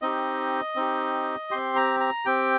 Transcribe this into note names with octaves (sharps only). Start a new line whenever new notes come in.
C4 D#4 G4 D#5
C4 D#4 G4
C4 G4 C6
A#5
A#5
C4 G4 G5